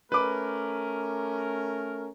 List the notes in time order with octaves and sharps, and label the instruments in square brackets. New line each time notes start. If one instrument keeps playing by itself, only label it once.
[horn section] A3 C#4 A#4 [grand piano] B4 D6